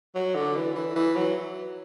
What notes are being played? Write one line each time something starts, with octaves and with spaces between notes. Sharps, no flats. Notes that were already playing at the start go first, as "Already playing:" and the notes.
F#3
D3
E3
E3
E3
F#3